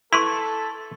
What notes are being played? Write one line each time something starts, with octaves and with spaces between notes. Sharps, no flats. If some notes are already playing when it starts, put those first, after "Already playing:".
E4 A4 B4 C6 C#6